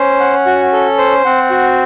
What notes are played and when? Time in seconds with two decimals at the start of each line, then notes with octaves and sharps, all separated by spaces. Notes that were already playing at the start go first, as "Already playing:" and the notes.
Already playing: C#4 C5
0.20 F#5
0.46 F#4
0.73 A4
0.98 C5
1.25 C4 F#5
1.50 F#4